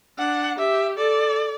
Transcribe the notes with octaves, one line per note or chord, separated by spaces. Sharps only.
D4 F#5
G4 E5
A4 D5